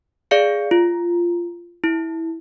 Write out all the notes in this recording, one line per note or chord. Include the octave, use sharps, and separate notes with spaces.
G#4 D5 F5 C#7
F4
E4